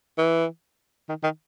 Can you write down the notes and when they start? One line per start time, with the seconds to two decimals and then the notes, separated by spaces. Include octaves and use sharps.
0.18 E3
1.09 D#3
1.23 D#3